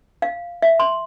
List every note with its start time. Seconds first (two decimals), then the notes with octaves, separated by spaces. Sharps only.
0.22 F5
0.62 E5
0.80 C6